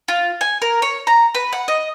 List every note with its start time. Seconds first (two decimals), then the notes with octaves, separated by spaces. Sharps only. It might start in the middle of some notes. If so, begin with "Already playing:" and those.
0.08 F4
0.41 G#5
0.62 A#4
0.82 C#5
1.07 A#5
1.35 B4
1.53 F#5
1.68 D#5